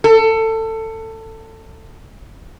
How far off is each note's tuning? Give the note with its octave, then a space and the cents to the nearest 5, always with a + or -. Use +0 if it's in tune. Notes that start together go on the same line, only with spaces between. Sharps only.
A4 +20